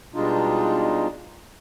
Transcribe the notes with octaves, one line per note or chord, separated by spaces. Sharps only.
B2 G3 G#3 D4 D#4 F4